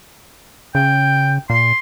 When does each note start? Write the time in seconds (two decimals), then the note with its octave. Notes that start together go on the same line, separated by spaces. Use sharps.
0.75 C#3 G5
1.50 A#2 C6